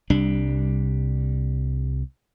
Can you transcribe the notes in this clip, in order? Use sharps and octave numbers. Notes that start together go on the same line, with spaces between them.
C2 G3 D4